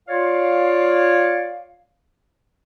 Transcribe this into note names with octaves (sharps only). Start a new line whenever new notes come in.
F4 C#5 D5 F5